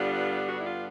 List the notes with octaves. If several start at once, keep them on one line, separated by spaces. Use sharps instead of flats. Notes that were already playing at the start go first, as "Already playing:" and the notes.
Already playing: G2 D3 G3 B3 D4 F4
F#4
E4
F4